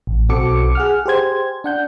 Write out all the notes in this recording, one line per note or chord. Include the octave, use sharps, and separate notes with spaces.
A1
B1 C4 F#4 A4 D6 C#7
G#4 F#5 F6
G4 G#4 C5 G#6
D4 F#5 G6